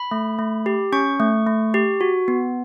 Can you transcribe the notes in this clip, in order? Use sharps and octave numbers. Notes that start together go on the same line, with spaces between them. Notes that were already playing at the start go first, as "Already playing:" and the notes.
Already playing: B5
A3
A3
G4
C#4 C#6
A3
A3
G4
F#4
B3